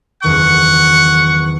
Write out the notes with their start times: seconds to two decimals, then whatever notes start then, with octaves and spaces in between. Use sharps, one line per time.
0.24 F#1 E2 D#3 F#5 C#6